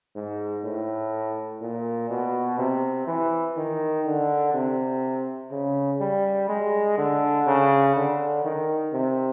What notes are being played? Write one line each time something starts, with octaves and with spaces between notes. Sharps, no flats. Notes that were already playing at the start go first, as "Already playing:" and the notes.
G#2
A2
A#2
B2
C3
E3
D#3
D3
C3
C#3
G3
G#3
D3
C#3
D3
D#3
C3